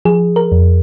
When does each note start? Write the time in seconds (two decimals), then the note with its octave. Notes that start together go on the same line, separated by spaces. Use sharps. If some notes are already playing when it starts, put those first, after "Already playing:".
0.05 F3 G#4
0.36 A#4
0.52 F2